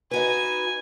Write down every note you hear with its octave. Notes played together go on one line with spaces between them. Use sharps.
D#4 F#4 B4 G#5